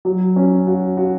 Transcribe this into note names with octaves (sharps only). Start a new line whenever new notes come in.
F#3
C#4
F#4
F#4